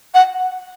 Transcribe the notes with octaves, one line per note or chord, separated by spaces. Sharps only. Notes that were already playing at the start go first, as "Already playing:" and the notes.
F#5